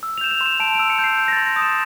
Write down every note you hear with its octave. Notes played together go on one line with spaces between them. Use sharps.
E6
F7
G6 E7
F7
C6
E7
A5 D7
D7
E6
C#7
G6
C7
G6
A#6
A6
C6
A#6
D#6
E7